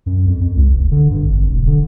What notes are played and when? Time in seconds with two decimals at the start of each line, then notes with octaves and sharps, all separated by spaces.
0.06 F#2
0.26 F2
0.40 F2
0.55 C#2
0.73 F1
0.91 D3
1.11 G2
1.25 G#1
1.48 E1
1.67 D3